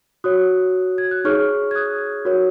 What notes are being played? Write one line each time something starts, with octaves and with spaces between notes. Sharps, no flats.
F#4 C#5 D#6 F#6
G#6
F#6
D#4 G#4 C#5 C#6 F6
G#6
D#6 F#6
F#4 A#4 C#5